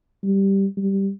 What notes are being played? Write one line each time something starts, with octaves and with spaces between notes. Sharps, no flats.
G3
G3